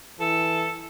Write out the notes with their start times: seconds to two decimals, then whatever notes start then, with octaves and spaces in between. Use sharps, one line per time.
0.20 E3 A4